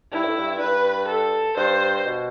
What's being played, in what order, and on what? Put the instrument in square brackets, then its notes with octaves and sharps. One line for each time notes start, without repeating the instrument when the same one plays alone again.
[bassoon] G2 [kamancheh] E4
[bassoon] A2
G2
[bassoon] G2 [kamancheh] B4
[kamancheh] A4
[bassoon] G2 [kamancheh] C5
[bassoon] B2